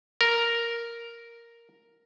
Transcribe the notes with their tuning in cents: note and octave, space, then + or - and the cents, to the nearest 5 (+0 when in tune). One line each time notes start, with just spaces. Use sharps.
A#4 +0